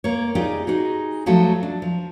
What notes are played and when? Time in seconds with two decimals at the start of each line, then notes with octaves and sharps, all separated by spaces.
0.04 A#3 C#5
0.35 D#4 F4 G4 G#4 D5
0.67 D#4 F#4 G#4
1.26 F3 F#3 A3 F#4 A4
1.63 D4
1.82 F3